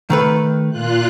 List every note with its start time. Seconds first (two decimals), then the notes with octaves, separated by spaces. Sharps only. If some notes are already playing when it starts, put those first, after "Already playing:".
0.10 D#3 A3 B4
0.70 A#2 F4 F#6